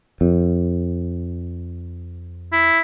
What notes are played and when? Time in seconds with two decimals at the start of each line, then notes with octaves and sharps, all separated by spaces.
0.21 F2
2.53 E4